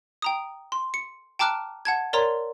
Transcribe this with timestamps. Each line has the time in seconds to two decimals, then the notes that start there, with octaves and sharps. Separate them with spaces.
0.22 G5 A#5 D#6
0.72 C6
0.94 C#7
1.39 G5 A5 A#5 D6 F6 F#6
1.85 F#5 A5 G#6
2.13 A#4 C#5 D5 A#5 C6